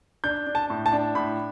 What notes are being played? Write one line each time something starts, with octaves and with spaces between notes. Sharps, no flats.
D4 G6
D4
A5
A2
A5
D4
A2 B5